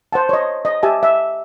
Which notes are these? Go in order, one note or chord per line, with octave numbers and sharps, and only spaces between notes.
C5 F#5 A5
C#5 D#5
D#5
G4 E5 G#5 A5
E5